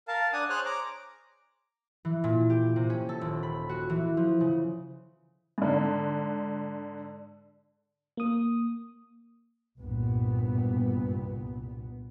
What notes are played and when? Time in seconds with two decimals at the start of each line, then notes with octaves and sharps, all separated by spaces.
0.08 A#4 F5 A5
0.33 D4 F#5 G#5 D#6
0.50 G#4 C5 C#5 F6 F#6
0.65 A#5 D6
2.05 E3
2.24 A#2
2.50 G4
2.76 C3
2.90 C#4
3.09 A4
3.21 D#1
3.43 B5
3.69 F#4
3.90 E3
4.17 F3
4.41 C#3
5.58 G#2 D3
8.17 A#3 D#6
9.78 C2 G2 A#2 B3